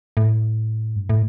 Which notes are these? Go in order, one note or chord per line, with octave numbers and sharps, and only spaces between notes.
A2
G2
A2